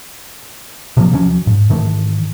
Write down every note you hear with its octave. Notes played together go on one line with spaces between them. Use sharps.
C3 F3 F#3 A#3
D#2 F3 F#3 C#4
G#2
G#2 D#3 E3 A3